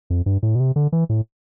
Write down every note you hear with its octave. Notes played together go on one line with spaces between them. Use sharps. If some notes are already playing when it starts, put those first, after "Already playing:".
F2
G2
A2
B2
C3
D3
E3
A2